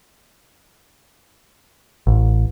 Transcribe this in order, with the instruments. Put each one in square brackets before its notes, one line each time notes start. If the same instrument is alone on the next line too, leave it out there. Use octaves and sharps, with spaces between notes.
[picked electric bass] A1